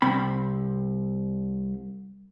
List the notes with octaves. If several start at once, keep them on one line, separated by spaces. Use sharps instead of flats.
C2 C4 B5